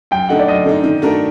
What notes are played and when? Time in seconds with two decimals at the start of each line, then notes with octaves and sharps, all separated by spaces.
0.11 F#2 G5
0.29 D3 A3 D#4 F#5
0.39 D5
0.48 F#2 D#5
0.65 D3 A3 D#4
0.84 D#3
1.02 A3 D4 F#4 A#4